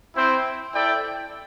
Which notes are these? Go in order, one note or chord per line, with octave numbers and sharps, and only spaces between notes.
C4 E4 C5 G5
E4 A4 D5 G5